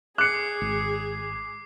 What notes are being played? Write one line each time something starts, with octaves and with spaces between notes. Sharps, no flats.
G#4 D6 F#6 C7 C#7
G#1